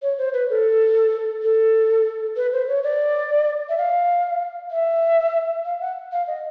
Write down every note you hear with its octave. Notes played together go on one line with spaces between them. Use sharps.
C#5
C5
B4
A4
A4
B4
C5
C#5
D5
E5
F5
E5
F5
F#5
F5
D#5